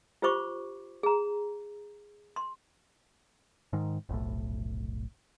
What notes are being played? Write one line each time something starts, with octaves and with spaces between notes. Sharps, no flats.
F4 G4 C5 B5 C#6 D6
G#4 A#5
C6
G#2 D#3
F1 B1 A2